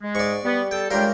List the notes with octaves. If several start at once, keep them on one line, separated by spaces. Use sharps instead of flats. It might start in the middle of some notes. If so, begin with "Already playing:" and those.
G#3
G#2 D5 C#6
G3 B3
A4 G5
C#2 G3 D4 A#4 F5 G5